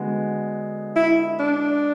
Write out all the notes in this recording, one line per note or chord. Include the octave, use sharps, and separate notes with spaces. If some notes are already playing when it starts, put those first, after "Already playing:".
Already playing: D3 G#3 B3 F#4
E4
D4